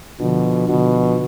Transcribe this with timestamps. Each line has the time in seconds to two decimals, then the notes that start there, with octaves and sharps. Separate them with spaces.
0.20 B2 D3 F3
0.69 B2 D3 F3